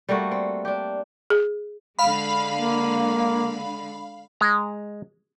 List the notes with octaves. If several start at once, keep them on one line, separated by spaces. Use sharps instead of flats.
G3 A3 A#3 F#4
C4
D4 G4
G#4
D3 G#3 F5 B5
A#3
G#3 A#5